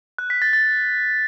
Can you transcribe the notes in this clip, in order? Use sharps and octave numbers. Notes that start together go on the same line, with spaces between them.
F#6
B6
A6
A6